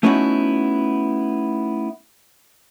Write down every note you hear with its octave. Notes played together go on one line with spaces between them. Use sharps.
A3 B3 C#4 D#4 E4 F#4